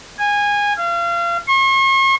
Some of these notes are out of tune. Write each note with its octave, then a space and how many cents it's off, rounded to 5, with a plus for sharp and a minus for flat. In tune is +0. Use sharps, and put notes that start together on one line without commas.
G#5 -20
F5 -30
C#6 -45